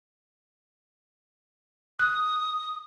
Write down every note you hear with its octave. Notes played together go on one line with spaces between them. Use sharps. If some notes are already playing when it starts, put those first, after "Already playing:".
D#6 F#6